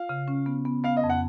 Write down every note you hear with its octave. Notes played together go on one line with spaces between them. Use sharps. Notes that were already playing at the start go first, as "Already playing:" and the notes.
Already playing: F4 F5
C#3
C#4
B3
B3
B3 F5
D#5
F2
F#5